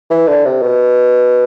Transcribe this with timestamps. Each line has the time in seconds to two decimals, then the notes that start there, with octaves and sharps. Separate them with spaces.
0.10 E3
0.27 D3
0.45 C3
0.62 B2